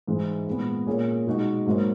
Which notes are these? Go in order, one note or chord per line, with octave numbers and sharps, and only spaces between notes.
G#2 E3 G#3
A#2 G#3 B3
A#2 A#3 C#4 G#4
B2 G#3 D#4 F#4
G#2 F#3 A#3 D#4